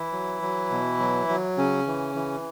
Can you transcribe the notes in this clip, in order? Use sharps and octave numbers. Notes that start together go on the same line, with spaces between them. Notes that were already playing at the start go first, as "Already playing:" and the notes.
Already playing: E3 E4
F#3
F#3
B2
F#3
F#3
C#3 C#4
E3
E3